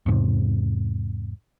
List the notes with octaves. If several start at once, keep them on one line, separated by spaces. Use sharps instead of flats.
E2 G#2 C3